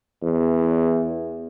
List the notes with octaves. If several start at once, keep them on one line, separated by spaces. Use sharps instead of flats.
E2